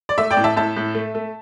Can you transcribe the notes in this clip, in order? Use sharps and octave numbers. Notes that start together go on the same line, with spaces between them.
D5
A3 E5
D5 G5
A2
E5 A5
A2 E5 A5
A2
A3
A3